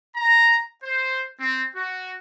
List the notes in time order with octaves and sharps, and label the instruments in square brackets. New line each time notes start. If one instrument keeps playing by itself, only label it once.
[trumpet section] A#5
C5
C4
F#4